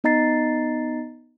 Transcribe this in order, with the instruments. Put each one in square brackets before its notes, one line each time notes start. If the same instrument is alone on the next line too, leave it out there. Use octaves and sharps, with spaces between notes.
[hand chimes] B3 D#4 D#5 A#5 A6 C7